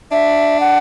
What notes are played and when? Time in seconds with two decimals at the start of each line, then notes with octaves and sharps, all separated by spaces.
0.11 D4 E5
0.60 F#5